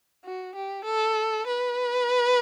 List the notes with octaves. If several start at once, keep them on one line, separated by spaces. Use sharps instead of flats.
F#4
G4
A4
B4